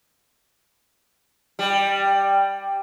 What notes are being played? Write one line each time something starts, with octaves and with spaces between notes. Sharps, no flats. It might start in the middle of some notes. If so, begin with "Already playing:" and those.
G3